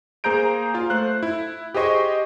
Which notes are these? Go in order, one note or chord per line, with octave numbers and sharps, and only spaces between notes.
A#3 G#4 C5 A#5 G6 D7
F4 F5
A3 C5 F#6
E4
G4 G#4 C5 D#5 C#6